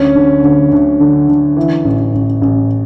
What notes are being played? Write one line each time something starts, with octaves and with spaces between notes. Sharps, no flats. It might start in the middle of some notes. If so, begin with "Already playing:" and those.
Already playing: D2 C#4
D3
D2
D2
D3
D3
E3
A1
A1
A1